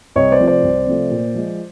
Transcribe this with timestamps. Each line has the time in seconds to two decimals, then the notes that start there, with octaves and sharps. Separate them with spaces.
0.16 C2 C#5 D#5
0.32 C5 D5
0.40 C3 F3 A3
0.47 C5 D5
0.63 C2
0.86 C3 F3 A3
1.11 A#2
1.35 F3 G#3